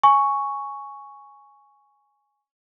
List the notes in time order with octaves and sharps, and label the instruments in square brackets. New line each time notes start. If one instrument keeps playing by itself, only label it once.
[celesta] G#5 C#6